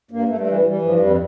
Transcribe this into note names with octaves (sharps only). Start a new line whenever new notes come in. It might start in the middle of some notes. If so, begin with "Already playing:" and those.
G2 A#3
G2 A3
A3
E3
G3
E3 G3
G2 F3
F2 G3